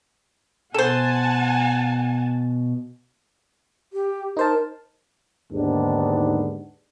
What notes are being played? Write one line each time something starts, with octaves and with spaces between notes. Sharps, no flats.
B2 A4 C5 F#5 G#5 A5
G4
D#4 A#4 C5 A5
D#2 G#2 D3 B3 D4